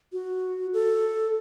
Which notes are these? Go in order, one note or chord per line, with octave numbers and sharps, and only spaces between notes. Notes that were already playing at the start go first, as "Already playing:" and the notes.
F#4
A4